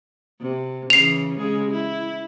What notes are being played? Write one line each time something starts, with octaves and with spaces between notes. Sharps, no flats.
C3
C#3 E3 C7 F7
C#3 G#3 G#4
E4